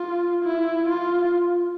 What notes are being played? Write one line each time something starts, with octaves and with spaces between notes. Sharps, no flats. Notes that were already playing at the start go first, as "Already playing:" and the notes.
Already playing: F4
E4
F4